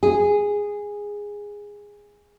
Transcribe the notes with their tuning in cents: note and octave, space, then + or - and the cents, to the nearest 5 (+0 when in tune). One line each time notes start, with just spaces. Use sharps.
G#4 -10